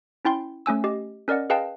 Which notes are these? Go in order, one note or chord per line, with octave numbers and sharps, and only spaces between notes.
C#4 E4 G5 C6
A3 C#4 G#5 E6
G4 D#5
C#4 A#4 D5 D#5 F#5
G#4 B4 D#5 F5 G5 A5